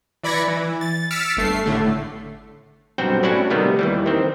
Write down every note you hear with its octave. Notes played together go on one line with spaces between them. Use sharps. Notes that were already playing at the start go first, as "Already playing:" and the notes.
E3 D5 B5 G#6 A#6 C#7
E3
A6
E6 F6 A6 B6 C#7 D7
G1 A3 C7
A2 D3 A3
B1 G2 C4 F#4 G5
A2 C#4 D4 E4 F#4 F#5
C3 D#3 G3 A3 B3
D#2 E3 G3
D#3 C4